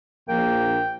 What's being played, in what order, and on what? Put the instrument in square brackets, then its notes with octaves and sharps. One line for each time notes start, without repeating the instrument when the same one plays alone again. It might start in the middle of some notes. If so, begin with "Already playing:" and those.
[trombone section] A#1 [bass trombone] A#3 [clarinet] G5